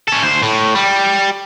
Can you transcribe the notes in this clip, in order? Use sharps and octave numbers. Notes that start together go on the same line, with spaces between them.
C#4 A4
D2 C5
A2
G3